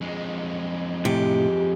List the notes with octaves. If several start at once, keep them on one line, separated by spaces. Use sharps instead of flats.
F2 G#3
A2 C3 G4